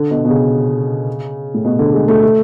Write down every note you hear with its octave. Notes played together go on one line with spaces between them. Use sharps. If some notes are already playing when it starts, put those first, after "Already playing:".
Already playing: D3
B2
B2
C#3
A2
B2
D3
G#3
A3
A3